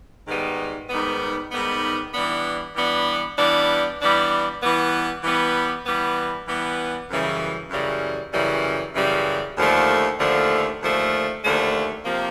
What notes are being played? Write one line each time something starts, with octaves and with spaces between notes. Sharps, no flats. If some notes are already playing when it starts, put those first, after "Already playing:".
G#2 D#3 G3 B3
G#2 D#3 G3 B3
G#2 D#3 G3 B3
E3 G3 B3 D4
E3 G3 B3 D4
E3 G3 B3 D4
E3 G3 B3 D4
E3 G3 B3
E3 G3 B3
E3 G3 B3
E3 G3 B3
F#2 C#3 E3 G3
F#2 C#3 E3 G3
F#2 C#3 E3 G3
F#2 C#3 E3 G3
D#2 D3 F3 A3
D#2 D3 F3 A3
D#2 D3 F3 A3
D#2 D3 F3 A3
C3 F3 A#3